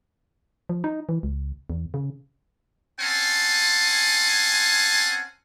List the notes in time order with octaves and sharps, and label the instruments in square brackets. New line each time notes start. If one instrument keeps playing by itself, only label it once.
[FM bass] F3
D#4
E3
C#2
E2
C#3
[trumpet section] C4 C#4 F#5 G#5 A5 C6